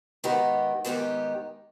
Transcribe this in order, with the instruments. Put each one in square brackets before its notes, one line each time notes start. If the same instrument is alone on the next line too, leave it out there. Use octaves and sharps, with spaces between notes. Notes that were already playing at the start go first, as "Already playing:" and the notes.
[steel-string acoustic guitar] G#2 D#3 B3 D#4 G4
G#2 D#3 B3 D#4 G4